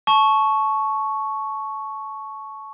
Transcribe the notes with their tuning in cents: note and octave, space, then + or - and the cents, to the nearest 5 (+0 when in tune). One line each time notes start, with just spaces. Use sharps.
A5 -20 C#6 +0